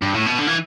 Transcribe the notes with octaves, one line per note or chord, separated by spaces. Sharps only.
G2
A2
B2
D3
E3